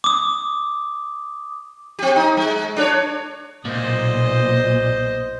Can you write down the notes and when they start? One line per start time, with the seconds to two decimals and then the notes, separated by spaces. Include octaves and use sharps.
0.04 D6 D#6
1.99 C4 G4
2.16 D#4
2.37 G#3
2.77 D4 G#4 C#5
3.65 B1 A#2 C5 D#5